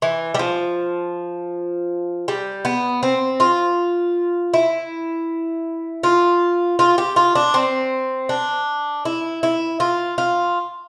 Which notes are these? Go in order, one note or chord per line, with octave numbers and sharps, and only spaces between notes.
E3
G3
F3
G3
B3
C4
F4
E4
F4
F4
G4
F4
D4
C4
D4
E4
E4
F4
F4